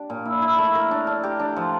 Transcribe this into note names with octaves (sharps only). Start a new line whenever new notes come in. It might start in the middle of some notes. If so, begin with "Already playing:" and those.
Already playing: D4 G4
A#2
E4
E4
A3
A#4
D4
D4
G4
D4
F3